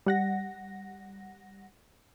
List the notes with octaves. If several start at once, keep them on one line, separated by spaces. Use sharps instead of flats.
G3 F#5 A#6